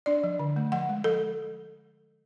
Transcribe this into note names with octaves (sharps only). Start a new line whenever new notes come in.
D4 D5
F3
D3
A3
F3 F#5
G#3
F3 A4